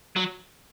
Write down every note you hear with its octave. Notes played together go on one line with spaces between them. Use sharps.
F#3